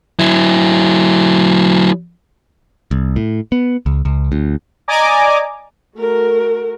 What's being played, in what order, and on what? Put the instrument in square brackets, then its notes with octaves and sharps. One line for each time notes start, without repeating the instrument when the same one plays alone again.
[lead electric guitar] F#3 E4
[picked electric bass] C2
A2
B3
C#2
C#2
D2
[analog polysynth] D5 D#5 G#5 A#5 D6
[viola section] A3 F#4 A#4